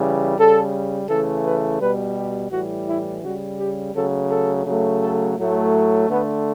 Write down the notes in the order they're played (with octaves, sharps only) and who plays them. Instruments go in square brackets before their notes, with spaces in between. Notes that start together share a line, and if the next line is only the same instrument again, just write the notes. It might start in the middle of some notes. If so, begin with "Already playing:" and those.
Already playing: [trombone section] C#3 E3 G3
C#3 G3 A4
C#3 E3 A3 A4
B4
B2 G3 B4
G4
A2 E3 G3 F#4
E4
C#3 G3 F#4
G4
C#3 F#3 A3 A4
A4
C#3 F#3 A3
A4
A2 F#3 A3
D3 A3 B3